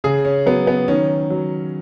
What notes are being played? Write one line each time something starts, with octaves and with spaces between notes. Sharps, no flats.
C#3 G#4
C#4
F#3 B3
B3
D#3 C#4
F#3